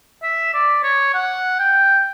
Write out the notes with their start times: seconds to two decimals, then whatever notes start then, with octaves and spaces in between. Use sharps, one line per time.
0.23 E5
0.54 D5
0.83 C#5
1.14 F#5
1.59 G5